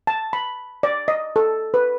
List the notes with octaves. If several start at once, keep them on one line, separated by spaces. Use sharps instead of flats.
A5
B5
D5
D#5
A4
B4